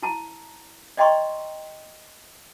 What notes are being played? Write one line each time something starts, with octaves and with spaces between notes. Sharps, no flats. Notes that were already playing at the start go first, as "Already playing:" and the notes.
E4 A5 A#5
D5 D#5 G5 A#5 C6 C#6